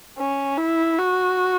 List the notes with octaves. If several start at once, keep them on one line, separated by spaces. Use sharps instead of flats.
C#4
E4
F#4